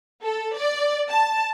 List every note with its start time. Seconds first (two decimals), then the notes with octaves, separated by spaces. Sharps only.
0.25 A4
0.57 D5
1.11 A5